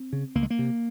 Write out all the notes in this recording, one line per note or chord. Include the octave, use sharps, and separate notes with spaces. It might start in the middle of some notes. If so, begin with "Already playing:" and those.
Already playing: C4
C#3
C#2 A#3
G#3
A#3
C3